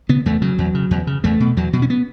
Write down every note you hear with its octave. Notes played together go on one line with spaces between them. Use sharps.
C#3 B3
E2 A3
C#3 F#3
E2
C#3
E2
C#3
E2 A3
B2
E2 F#3
B2 F#3
C#4
B3